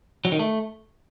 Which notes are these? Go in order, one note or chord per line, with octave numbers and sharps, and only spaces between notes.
F#3
D#3
A3